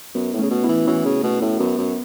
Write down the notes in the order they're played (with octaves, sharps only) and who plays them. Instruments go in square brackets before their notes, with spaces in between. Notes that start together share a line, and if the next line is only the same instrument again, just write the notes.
[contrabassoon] F#2 [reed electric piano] B3
[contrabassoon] A2
[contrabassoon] C#3 [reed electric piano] A3 C#4
[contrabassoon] B2
[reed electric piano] B3 E4
[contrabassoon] E3
[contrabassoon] E3 [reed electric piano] C#4 F#4
[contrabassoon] C#3
[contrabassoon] B2 [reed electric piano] A3
[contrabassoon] A2
[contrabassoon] F#2 [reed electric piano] B3
[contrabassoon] F#2